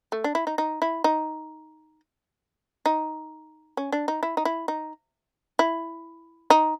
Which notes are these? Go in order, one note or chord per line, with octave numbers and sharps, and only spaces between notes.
A3
D4
E4
D#4
D#4
E4
D#4
D#4
C#4
D4
D#4
E4
D#4
E4
D#4
E4
D#4